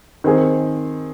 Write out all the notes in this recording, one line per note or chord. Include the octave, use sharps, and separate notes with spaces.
D#3 C4 G#4